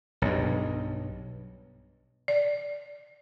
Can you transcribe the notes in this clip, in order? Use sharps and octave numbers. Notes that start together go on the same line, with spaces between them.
B1 G2
D5